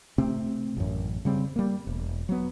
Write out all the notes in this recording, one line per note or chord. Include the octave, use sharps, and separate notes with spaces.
C3 A3 C4
A1 F#2
C#3 G3 C4
G3 A#3
E1
F#3 B3